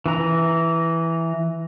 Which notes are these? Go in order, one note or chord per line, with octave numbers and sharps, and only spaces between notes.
E3 A#5